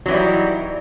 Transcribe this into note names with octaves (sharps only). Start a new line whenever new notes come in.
E3 F#3 G3 D#4 E4